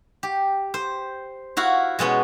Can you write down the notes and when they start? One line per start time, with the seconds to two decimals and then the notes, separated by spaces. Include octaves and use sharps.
0.23 G4
0.74 C5
1.57 E4 F#4 F5
1.99 B2 G#3 B3 C#4